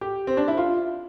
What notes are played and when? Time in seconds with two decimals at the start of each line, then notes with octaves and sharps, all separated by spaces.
0.01 G4
0.27 C4
0.37 D4
0.48 E4
0.57 F4